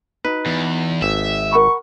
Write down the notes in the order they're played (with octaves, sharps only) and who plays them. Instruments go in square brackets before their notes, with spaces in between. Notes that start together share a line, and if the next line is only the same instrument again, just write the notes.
[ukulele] D#4 F#4 [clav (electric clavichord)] B4
[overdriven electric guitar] E2
[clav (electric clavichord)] G#1 [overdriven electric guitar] E5
[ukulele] A#4 F#5 B5 [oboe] C#6